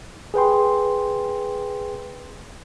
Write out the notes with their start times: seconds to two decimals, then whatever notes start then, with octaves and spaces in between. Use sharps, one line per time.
0.34 G#4 B4 G5 C6